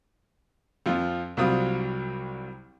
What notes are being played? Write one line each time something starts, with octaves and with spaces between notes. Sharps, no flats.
F2 F3 F4
C2 F#3 G3 C4 F4 D#6